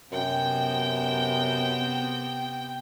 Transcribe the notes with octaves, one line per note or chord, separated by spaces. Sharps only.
F#2 C3 B3 C4 G5